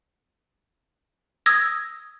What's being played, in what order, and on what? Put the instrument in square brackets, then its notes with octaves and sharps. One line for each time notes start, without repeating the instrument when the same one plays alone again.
[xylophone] D#6 E6 G#6 A#6